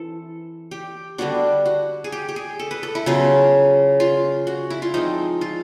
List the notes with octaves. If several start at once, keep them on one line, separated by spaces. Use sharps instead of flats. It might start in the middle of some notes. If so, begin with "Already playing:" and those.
Already playing: E3 C4 A4
G4
D3 G3 B3 D4 F#4
F#4
G#4
G4
G4
G#4
A4
B4
A4
E4
C#3 F#3 B3 F4
F4
F#4
E4
F4
F3 G#3 C4 D#4
F4